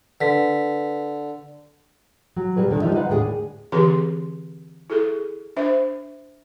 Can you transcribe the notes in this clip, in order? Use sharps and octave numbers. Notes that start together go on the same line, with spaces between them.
D3 B4 B6
F#3
C3 G3 G#4 B4
D2 A#2 D3 D#3
F3 G3 G#3 D#4 F4 E5
G#3 D#4 B4 F5 F#5
D#2 A2 D3 F#4 G#4
D3 E3 C4 G4 G#4 C6
E4 G#4 A4
D4 C5 E5